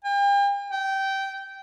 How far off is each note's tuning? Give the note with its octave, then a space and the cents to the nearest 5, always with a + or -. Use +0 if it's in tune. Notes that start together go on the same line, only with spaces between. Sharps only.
G5 +40
G5 -15